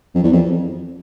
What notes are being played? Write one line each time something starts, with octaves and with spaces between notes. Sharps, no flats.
F2
E2
F2